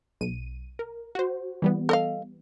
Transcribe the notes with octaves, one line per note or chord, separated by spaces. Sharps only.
B1 D#7
A#4
F#4 C5
E3 G3 B3
A4 D#5 F5